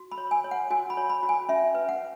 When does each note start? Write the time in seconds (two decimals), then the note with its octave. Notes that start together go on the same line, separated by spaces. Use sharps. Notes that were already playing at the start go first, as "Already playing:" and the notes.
Already playing: F#4
0.12 B5
0.18 C#5
0.31 G#5
0.44 C#5
0.51 F#5
0.70 F#4 G#5
0.90 B5
0.97 C#5
1.10 B5
1.23 F#4
1.29 G#5
1.49 C#4 E5
1.75 B4
1.89 F#5